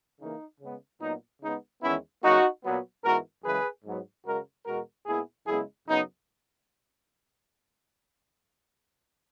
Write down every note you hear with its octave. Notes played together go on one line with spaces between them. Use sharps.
C#3 E3 A#3 D#4
C#3 G#3 B3
A#2 F#3 B3 D#4
C#3 G#3 B3 D#4
E2 D#3 G#3 B3 C#4 E4
C#3 F#3 A#3 D#4 F#4
A#2 F#3 B3
G#2 E3 B3 F#4 A#4
F#2 C#3 E3 G#3 G#4 B4
G#2 F#3 B3
F#2 C#3 G#3 F#4 A#4
E2 B2 G#3 F#4 A#4
A#2 G#3 B3 E4 G#4
F#2 C#3 G#3 B3 E4 G#4
F#2 C#3 F#3 B3 D#4